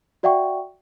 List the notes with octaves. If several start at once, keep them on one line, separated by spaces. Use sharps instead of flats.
F#4 D5 E5 F#5 G5 C#6